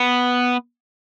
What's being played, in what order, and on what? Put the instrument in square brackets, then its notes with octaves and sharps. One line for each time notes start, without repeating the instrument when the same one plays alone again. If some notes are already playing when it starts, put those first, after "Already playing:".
Already playing: [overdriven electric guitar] B3